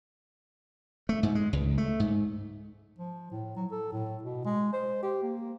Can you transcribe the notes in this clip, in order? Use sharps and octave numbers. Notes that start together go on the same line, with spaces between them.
A3
G#2
G#3
C#2
A3
G#2
F3
A2
F#3
A4
A2
B2
G#3
C5
G4
A#3